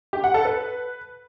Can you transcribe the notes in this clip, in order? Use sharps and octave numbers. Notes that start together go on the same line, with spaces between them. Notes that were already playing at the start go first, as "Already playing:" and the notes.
G4
F#5
A4
B4